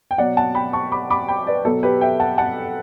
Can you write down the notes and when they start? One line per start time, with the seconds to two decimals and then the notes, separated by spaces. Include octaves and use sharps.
0.11 G5
0.18 B2 F#3 D5 F#5
0.37 F#5 A5
0.55 G5 B5
0.73 A5 C#6
0.92 B5 D6
1.10 B5 D6
1.28 G5 B5
1.47 B4 D5
1.65 B2 F#3 A4
1.83 G4 B4
2.01 E5 G5
2.20 F#5 A5
2.38 F#5 A5